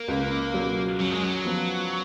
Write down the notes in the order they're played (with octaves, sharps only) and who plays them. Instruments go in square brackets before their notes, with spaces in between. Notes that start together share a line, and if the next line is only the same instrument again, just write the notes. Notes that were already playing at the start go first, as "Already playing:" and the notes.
Already playing: [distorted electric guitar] A#3
[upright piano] C#2
B2 F#3
[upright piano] F#2 [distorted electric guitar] F#3
[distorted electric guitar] G#3
F#3
[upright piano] F3 B3